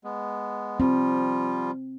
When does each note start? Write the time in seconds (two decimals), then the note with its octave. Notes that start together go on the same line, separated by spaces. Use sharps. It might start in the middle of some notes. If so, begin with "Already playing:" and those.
0.04 G#3 B3
0.80 F3 G3 C4 F4